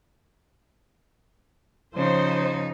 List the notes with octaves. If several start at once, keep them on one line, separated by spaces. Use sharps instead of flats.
C#3 F3 D#4 C5